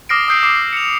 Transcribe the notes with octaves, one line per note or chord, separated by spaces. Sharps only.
D6 D#6 F6 A#6 C7 D7
D#6 E6 G6 C7 D7
D6 C7
C#7 F7